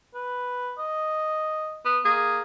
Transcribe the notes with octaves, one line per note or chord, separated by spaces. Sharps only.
B4
D#5
B3
A#3 G#4